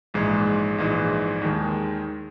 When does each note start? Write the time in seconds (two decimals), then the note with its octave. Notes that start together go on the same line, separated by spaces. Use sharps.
0.14 A#1 G#2 E3 G#3
0.78 A#1 G#2 E3 G#3
1.41 D#2 D#3 G#3